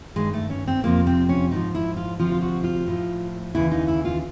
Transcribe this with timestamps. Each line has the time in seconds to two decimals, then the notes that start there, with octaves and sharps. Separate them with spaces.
0.16 G2 D#3 G#3
0.34 A3
0.50 C#4
0.67 C4
0.84 F2 C3 F3 A#3
1.07 C4
1.29 C#4
1.51 G#2 F3 D#4
1.75 E4
1.97 F4
2.19 D2 C3 F3 F4
2.32 F4
2.41 F#4
2.64 F4
2.87 A2 F3
3.55 D#2 C#3 E3 E4
3.71 D#4
3.88 E4
4.05 F4